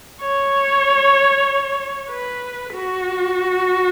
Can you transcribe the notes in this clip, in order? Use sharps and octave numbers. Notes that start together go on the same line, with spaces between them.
C#5
B4
F#4